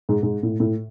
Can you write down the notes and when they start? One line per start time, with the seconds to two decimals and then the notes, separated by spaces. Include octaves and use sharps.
0.09 G#2
0.23 G#2
0.43 A2
0.60 A2